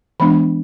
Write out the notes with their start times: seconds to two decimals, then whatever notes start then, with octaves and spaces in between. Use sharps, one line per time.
0.20 E3 G#3 B3 D4 B5